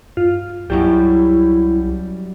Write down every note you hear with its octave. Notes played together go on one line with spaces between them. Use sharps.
G2 F4
C2 F#2 F#3 G3 E4 G4